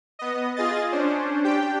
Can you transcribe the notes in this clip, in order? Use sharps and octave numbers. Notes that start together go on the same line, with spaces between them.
B3 D#5
F4 G#4 D#5 A6
C#4 D4 C5
D4 G4 G5